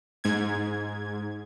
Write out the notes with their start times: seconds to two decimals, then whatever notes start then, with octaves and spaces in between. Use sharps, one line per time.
0.24 G#2 G#6